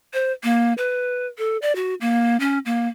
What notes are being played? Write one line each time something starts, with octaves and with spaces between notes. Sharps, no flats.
C5
A#3
B4
A4
D5
F#4
A#3
C#4
A#3